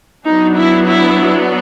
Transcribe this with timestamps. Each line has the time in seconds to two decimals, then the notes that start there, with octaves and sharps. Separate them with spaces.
0.25 F#3 B3 D4 D#4
0.55 E4
0.85 E4